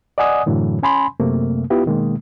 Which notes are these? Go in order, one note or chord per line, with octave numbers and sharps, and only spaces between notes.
D5 D#5 F#5 G#5 D#6
F#2 A2 D3 E3 F#3
C#4 G#5 B5 C6
F#2 C3 A3 A#3
B3 E4 F4 G4
B2 D#3 G#3 A#3